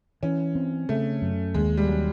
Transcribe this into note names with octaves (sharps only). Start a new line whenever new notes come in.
E3 C#4
C4
C#3 A3
F#2
D#2 G#3
G3
F#3